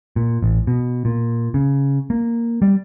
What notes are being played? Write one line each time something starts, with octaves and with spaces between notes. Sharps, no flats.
A#2
A1
B2
A#2
C#3
A#3
G3